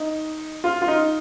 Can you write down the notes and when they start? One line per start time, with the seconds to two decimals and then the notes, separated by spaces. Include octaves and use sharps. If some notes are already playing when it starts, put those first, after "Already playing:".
Already playing: D#4
0.64 F4
0.82 F4
0.88 D#4